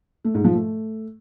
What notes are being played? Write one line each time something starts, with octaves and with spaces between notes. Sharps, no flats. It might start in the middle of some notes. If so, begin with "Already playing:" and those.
A3
G#2
F3
A3